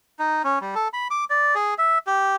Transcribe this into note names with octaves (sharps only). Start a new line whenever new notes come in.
D#4
C#4
G3
A4
B5
D6
D5
G#4
E5
G4